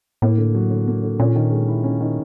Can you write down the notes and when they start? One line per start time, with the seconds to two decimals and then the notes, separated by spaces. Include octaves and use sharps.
0.22 A2 A#3
0.38 D3
0.54 F#3
0.71 D3
0.87 A#3
1.03 D3
1.19 A#2 C#4
1.36 D#3
1.52 G#3
1.68 E4
1.84 C#4
2.01 D#3